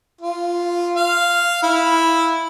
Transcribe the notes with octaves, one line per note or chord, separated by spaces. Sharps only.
F4
F5
E4